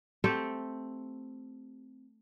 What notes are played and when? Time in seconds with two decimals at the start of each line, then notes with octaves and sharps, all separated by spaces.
0.24 A3 C4 G4 A4